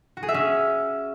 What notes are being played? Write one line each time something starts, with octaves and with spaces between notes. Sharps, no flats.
F#4
G#4
E5
C#4